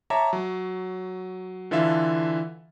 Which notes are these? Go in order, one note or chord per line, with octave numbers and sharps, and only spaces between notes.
C#5 E5 A5 A#5 D6
F#3
D3 E3 F4 A4 E5 F5